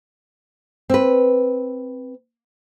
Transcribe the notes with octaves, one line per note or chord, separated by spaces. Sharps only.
C4 B4